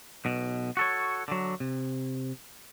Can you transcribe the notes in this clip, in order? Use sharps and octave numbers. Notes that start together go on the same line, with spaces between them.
B1 B2
F#4 A4 C#5
D3 F#3
C3